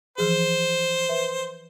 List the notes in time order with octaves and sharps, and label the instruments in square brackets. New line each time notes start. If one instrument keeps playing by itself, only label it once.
[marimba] E3 F3 G#4 [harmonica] C5
[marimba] B4 E5